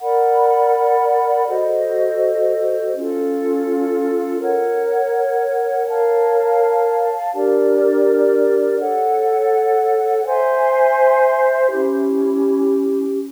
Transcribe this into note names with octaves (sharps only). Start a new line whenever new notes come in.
A#4 D5 F#5 B5
F#4 A4 C5 D#5
C#4 F4 A4
A#4 C#5 F#5
A#4 C#5 F5 A5
D4 G4 A#4 D5
A4 C#5 F#5
C5 E5 G#5 C6
C#4 E4 G4